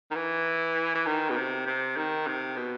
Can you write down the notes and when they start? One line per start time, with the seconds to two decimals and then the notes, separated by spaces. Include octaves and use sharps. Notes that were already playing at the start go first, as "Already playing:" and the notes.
0.11 D#3
0.15 E3
0.95 E3
1.06 D#3
1.30 B2
1.36 C3
1.66 C3
1.97 D#3
2.27 C3
2.56 B2